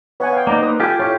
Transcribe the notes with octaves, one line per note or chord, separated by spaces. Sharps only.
B3 C#5 F#5 G#5
F5 G5
A#3 D#4 D5 A#5 D6
B4 C5 D#6
F4 G4 A4 G#5
A2 F4 G4 C#5